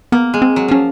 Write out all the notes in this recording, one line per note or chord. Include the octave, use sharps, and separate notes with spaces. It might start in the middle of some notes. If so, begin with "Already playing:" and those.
A#3 B3
G#3
C4
F#3
F3 C#4